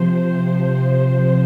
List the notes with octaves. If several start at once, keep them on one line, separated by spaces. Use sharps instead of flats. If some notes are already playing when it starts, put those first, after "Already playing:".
Already playing: C3 F3 C5